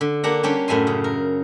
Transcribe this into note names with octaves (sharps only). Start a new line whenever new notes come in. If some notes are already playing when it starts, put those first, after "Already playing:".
D3
A#3 D4 G4 F#5 A#5
G3 C#4 D4 G4 C#5
F#2 A2 E5 G#5 C6
C#3
A#4